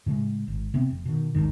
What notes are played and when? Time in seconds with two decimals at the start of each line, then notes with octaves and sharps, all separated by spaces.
0.06 A2 C#3 F#3 G#3
0.48 G#1
0.74 C3 B3 C4
0.90 F1
1.05 B2 D#3
1.35 D#1 A1 G#2 D#3